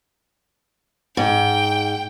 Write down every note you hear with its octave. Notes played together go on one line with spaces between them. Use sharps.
G#2 G5